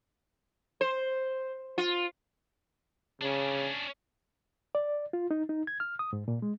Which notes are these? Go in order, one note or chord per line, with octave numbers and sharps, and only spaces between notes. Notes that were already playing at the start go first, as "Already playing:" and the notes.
C5
F4
C#3 C#4 D4
D5
F4
D#4
D#4
G#6
F6
D#6
G#2
A#2
G#3